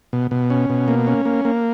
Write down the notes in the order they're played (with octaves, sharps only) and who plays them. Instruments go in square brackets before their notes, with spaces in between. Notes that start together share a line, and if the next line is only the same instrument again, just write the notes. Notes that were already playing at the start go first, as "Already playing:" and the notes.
[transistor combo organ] B2
B2
C#4
B2
A#3
C#4
A#3
A#3